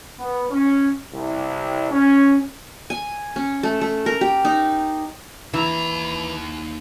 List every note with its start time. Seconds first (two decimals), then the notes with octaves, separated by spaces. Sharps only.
0.19 B3
0.51 C#4
1.13 C2
1.91 C#4
2.90 G#5
3.36 C#4
3.63 A3
3.81 A3
4.06 A#4
4.21 G4
4.45 D#4
5.54 D#2 E3 A#5